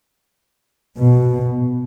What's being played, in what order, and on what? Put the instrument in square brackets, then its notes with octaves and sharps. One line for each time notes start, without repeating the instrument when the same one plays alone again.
[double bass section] B2